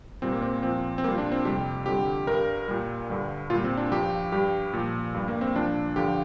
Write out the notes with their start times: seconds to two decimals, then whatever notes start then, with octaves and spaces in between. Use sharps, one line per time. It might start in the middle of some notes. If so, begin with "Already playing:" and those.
0.22 A#2 G3 C4
0.32 A#3
0.42 C4
0.63 A#2 F3 C4
0.98 C4
1.04 A#2 A#3
1.07 G3 F4
1.18 D4
1.32 C4
1.45 F2 C3 G3 G4
1.86 F2 D3 G3 G4
2.27 G2 G3 A#4
2.68 A#2 G3
3.10 G2 D3 G3
3.50 A#2 G3 F4
3.64 C4
3.77 D4
3.92 G2 F3 G4
4.32 G2 G3 G4
4.73 A#2 F3
5.15 G2 G3
5.28 A#3
5.41 C4
5.56 A#2 F3 D4
5.96 G2 D3 F3 G4